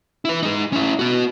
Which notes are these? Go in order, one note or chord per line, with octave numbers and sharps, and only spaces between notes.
E4 B4
G#3 D#4
C#4 E4
B3 F#4